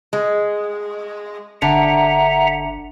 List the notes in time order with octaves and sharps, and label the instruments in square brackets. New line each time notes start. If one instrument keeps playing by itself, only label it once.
[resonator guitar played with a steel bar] G#3
[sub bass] G1 [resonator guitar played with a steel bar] D3 [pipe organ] E5 F#5 A#5